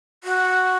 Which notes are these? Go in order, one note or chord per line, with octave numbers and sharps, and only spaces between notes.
F#4